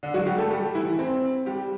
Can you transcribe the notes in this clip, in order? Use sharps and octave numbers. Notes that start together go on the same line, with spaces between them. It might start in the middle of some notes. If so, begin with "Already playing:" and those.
D3 D4
F#3 F#4
G3 G4
A3 A4
G3 G4
E3 E4
C4
G3 G4